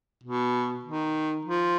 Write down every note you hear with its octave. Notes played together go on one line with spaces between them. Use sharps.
B2
D#3
F3